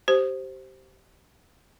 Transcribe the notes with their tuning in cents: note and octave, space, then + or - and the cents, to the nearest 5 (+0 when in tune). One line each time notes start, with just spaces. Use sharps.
G4 -25 C5 +5